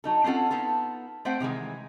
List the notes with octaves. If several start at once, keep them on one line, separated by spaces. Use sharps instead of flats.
F#3 D#4 A4
C4 C#4 F4 A4 F#5
B3 D#4 F4 A4
A3 C4 C5 F#5 G5
C3 D#3 E3 G#3